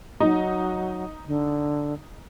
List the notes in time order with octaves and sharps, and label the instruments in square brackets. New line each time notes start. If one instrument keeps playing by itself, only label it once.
[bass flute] F#3 [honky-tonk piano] D#4
[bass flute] D3